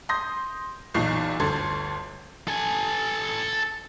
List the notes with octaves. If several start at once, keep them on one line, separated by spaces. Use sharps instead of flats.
C6 D#6 G6 A#6
B1 E2 A#2 D#4 C#6 C7
G1 D2 A4 C6 G#6
A4 G#5